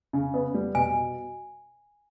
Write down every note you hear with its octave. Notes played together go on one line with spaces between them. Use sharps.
C#3
B3
G3
B2 G#5